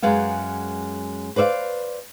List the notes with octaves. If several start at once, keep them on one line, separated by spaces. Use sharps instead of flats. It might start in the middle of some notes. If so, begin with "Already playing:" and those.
F#2 G#3 B3 F5
B4 C5 D5 E5 F5